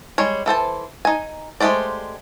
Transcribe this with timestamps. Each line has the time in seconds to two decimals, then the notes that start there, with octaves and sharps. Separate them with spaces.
0.18 G3 G#3 C#5
0.46 E3 A4 C5 A5
1.05 D#4 G#5
1.60 G#3 A3 G4 C5 D5